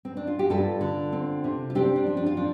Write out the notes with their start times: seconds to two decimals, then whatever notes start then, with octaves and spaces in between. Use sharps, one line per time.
0.05 C4
0.17 D4
0.27 F4
0.39 G4
0.50 G2 F4 A4
0.81 D3
1.12 C4
1.44 C3
1.70 F4
1.75 C4 D4 G4
1.96 D4
2.06 F3
2.17 D4
2.26 F4
2.37 F3 D4